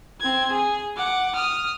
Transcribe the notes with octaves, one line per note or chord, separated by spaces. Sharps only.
C4 G#6
G#4
F#5 D6
D#6 F6